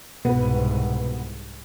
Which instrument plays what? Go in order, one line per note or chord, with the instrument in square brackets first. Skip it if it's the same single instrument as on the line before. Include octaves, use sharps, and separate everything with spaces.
[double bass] C2 G#2 [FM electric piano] B2 [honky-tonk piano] B3 B4